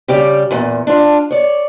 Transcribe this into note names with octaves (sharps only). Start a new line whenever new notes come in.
C#3 G3 G4 D5
E2 A#2
D4 F4
C#5 D5